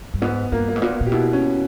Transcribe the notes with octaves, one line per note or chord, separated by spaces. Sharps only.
G2
G#2 B3
G2 A#3
A#3
G#2
A#2 B3
A#2
G4
B2 E4
C#4